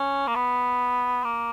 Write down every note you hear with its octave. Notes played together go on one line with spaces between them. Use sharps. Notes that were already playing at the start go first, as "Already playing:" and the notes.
Already playing: C#4
A#3
B3
A#3